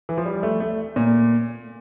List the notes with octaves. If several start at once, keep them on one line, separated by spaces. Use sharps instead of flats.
E3
F3
G3
A3
A3
A#2